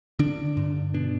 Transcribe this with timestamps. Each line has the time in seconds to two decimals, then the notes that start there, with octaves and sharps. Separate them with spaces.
0.19 D3 D4
0.57 G2
0.94 B2 D4